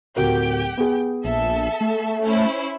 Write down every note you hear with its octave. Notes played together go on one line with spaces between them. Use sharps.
D1 F#4 G4 A#4 G5
B3 G#4
A#1 A4 E5
A3
C#4 E4 C5